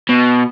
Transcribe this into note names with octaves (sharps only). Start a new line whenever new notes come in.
B2